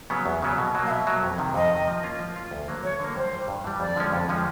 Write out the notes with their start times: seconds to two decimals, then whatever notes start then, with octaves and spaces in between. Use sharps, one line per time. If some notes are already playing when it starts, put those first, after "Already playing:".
0.10 C#3 F#3 B3
0.26 E2
0.42 C#3 F#3 B3
0.58 B2
0.75 F#3 A#3
0.86 F5
0.90 B2 E5
1.07 F#3 A#3
1.23 F2
1.38 C3 D#3
1.54 F2 D#5
1.71 C3 D#3
1.87 F3
2.03 A#3 C#4 F4
2.19 F3
2.35 A#3 C#4 F4
2.51 D2
2.68 D3 F#3 A#3
2.83 D2 C#5
2.99 D3 F#3 A#3
3.16 G2 C5
3.33 E3 G3
3.48 G2
3.64 E3 G3
3.80 F2 D5
3.96 D3 F3 G#3 C#4
4.12 F2
4.28 D3 F3 G#3 C#4